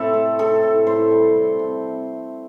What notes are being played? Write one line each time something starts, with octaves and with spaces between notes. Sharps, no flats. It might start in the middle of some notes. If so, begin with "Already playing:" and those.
Already playing: A2 C3 C4 E4 A4
A3
A2 A4
A2
A2 C5
G3
C3
C3